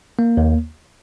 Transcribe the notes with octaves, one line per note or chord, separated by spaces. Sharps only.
A#3
D#2